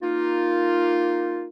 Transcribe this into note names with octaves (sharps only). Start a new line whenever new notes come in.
A#3 D#4 F4